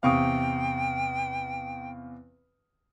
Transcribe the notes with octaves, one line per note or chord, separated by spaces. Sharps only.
E2 C3 F5 G5 C#6 D#6